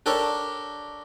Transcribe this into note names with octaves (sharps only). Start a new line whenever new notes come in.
D4 G4 A4 A#4 C#5